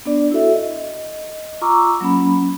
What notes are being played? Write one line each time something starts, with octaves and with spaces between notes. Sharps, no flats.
B3 D4 D5
E4 F#4 A4 E5
D#5
F4 A#5 C#6 D6 E6
F#3 A#3 C#4 B5